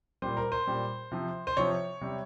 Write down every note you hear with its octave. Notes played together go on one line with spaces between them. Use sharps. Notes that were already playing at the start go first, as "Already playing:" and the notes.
A#2 G3 C5
A#4
C5
A#2 G3
C3 F3
C5
C3 F3 C#5
C3 G3